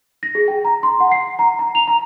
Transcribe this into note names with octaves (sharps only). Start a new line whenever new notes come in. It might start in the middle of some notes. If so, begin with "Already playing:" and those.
A#6
G#4
G5
A#5
C6
F#5
C7
A#5
A#5
F7
A#5